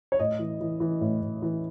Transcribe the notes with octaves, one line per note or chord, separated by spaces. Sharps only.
C#5
A2 D#5
E3
E3
E3
A2
A2
E3